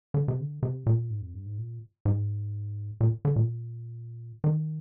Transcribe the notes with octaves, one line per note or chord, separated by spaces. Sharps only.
D3
C3
D3
C3
A#2
G#2
F2
G2
G#2
A#2
G#2
A#2
D3
A#2
D#3